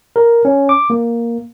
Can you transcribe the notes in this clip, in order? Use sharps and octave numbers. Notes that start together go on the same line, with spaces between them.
A#4
C#4
D6
A#3